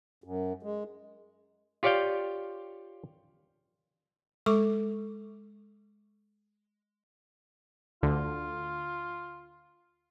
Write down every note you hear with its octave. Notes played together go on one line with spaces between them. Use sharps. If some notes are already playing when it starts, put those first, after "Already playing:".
F#2
G#3
F4 G4 C#5 D5 F5 G5
G#3 A4 C#6 D6
D2 D3 F4